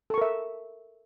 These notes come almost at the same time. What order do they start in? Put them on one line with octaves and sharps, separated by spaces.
A4 C#6 A#4 E5